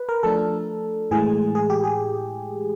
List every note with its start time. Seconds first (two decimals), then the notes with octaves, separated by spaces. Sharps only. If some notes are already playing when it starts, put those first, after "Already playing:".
Already playing: B4
0.09 A#4
0.23 F3 A3 D4 A4
1.11 A2 E3 G#3 G#4
1.55 G#4
1.70 G4
1.84 G#4